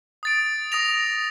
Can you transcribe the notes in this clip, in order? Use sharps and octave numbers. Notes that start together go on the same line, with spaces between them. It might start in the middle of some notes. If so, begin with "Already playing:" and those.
D#6 A6 D7
D#6 A#6 F7